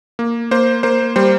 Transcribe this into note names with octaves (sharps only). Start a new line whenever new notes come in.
A#3
A#3 C5
A#3 C5
G3 C5